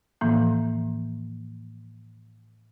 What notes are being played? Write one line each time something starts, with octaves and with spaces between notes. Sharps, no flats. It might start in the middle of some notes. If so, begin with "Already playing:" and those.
A2 E3 F3 A#3